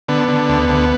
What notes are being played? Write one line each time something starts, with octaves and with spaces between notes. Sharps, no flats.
D3 B3
D3
D2
D2